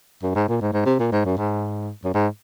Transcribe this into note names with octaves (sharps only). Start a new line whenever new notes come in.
F#2
G#2
A#2
G#2
G#2
C3
A#2
G#2
F#2
G#2
F#2
G#2